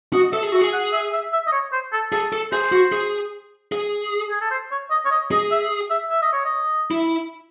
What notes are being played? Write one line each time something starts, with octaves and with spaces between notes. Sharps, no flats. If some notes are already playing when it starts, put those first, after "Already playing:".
F#4 D#5
D#5
A4 E5
G#4
F#4 E5
G#4
F#5
E5
E5
E5
D#5
C#5
C5
A4
G#4 A4
A4
G#4 C5
F#4
G#4
G#4
G#4
A4
C5
C#5
D#5
C#5
D#5
G#4 D#5
E5
E5
E5
D#5
C#5
D#5
E4